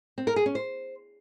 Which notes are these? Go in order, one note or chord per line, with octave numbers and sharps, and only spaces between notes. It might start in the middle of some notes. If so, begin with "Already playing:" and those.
C4
A#4
G#4
C#4
C5